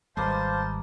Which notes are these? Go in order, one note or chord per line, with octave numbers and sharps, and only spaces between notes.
G#1 G3 A#3 B4 C5 D#5 F5 A5